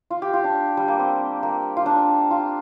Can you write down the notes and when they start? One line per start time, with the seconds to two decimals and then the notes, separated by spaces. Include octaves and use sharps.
0.10 F4
0.22 G4
0.33 F4
0.44 D4
0.77 G3
0.88 A#3
0.99 C4
1.43 A#3
1.77 F4
1.86 D4
2.31 F4